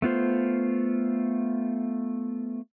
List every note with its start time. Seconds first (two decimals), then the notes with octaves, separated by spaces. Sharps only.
0.02 A3 B3 F4 C5